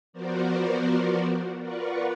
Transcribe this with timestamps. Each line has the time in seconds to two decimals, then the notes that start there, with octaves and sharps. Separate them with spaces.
0.13 F3 B3 F#4 A#4 C5 D5
1.59 F4 A#4 B4 D5 F#5 C#6